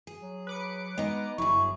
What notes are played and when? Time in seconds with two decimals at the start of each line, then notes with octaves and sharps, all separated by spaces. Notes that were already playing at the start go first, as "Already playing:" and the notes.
0.07 G#4
0.22 F#3
0.47 B4 D6 C#7
0.98 G#3 B3 D#4
1.38 G1 F#3 E4 G#4 C#6